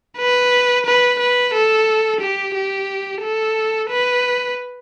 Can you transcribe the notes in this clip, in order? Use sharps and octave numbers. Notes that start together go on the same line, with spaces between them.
B4
B4
B4
A4
G4
G4
A4
B4